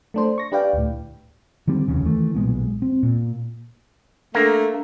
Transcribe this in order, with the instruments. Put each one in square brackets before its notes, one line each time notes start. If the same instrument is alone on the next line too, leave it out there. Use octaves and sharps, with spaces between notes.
[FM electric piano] A3 D4 C5
C#6 A#6
D4 G4 B4 D5 F5 G5
D2 A2
[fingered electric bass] D3 D#3 G3 C4
F1 D#2 C#3
D#3 E3 A3
B1 A#2 G#3 B3
C4
A#2
[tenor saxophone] A3 [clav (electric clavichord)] A#3 [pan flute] D4